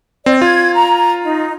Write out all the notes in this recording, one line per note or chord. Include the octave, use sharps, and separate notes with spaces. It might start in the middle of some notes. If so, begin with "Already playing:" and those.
C4 D5
F4 G#6
A#5
D#4